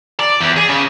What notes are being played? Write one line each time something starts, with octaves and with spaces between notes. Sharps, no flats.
D5
E2
G#4
C#3